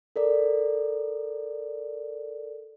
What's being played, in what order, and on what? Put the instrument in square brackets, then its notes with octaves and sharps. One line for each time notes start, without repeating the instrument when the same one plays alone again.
[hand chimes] A4 A#4 D5